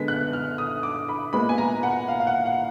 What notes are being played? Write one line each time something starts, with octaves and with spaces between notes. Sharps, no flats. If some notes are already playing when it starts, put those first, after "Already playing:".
Already playing: D3 G#3 B3 B6
F#6
F6
D#6
D6
B5
A#2 G#3 B3 B5
G#5
A#5
F#5
F5
F5
F#5
F#5